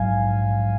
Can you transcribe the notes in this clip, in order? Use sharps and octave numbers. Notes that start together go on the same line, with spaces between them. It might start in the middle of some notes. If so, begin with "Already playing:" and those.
Already playing: A#1 G#2 F#3 F5 G#5